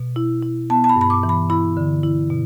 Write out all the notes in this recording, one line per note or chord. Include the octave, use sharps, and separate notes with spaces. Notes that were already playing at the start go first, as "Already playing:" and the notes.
Already playing: B2
E4
E4
B3 A5
A5
B5
G2
B5
D6
E3
B5
E4 B5
D3
E4
B2